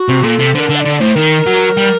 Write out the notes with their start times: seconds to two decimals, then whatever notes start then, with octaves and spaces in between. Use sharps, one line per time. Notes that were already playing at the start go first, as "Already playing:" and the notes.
Already playing: F#4
0.08 C3
0.24 A#2 A4
0.39 C3
0.55 D3 A#4 C5
0.69 D3
0.75 F#5
0.80 D3 D5
0.96 D5
1.00 A2 C5
1.15 D#3 A#4
1.47 F#3
1.77 G3